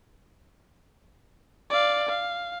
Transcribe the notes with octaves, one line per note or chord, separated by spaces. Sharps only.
D5 F5
F5